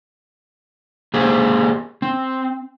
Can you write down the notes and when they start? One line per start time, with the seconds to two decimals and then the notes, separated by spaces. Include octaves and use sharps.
1.14 A#3 G4 G#4 C5
2.02 C4